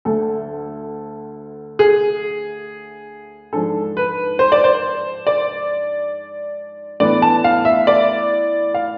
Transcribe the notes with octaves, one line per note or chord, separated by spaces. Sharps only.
D2 D3 A3 D4 A4
G#4
G#2 F3 G#3 D4 A4
B4
C5
D5
C5
D5
A2 E3 B3 D4 D5
A5
F5
E5
D5
F5